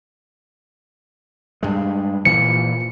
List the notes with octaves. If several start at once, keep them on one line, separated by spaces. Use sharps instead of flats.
G2 G#3
A#2 E3 F3 C#7